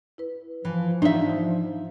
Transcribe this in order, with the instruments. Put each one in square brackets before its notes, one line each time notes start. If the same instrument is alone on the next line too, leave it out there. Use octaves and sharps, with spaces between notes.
[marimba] E4 B4
[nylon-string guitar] E3 [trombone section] F3
[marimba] G#2 E3 D5 [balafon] D4 [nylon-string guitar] D#4 E5